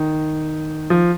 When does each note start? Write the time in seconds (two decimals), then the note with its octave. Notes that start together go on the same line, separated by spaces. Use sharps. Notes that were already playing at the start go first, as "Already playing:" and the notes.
Already playing: D#3
0.90 F3